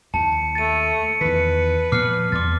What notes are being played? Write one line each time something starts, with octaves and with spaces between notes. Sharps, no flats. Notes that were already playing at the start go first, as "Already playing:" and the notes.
D#2 A5 C#7
A3 A6 D#7
E2 D#3 B4 B6
A#2 F3 B3 D6 F6 C7
E2 C6 D6 A6